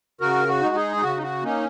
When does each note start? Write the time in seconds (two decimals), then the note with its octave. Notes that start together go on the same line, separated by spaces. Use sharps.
0.21 C#3 F#4 A#4
0.48 F#4
0.62 G#3 D#4
0.75 D#4 G#4
0.97 D#4
1.02 C#3 F#4
1.18 D#4
1.23 F#4
1.43 A#3 C#4 D#4